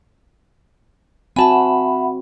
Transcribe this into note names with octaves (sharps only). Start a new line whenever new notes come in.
C4 F#4 E5 F#5 G#5 A5 B5